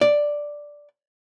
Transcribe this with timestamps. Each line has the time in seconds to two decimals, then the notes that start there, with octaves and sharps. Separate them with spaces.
0.01 D5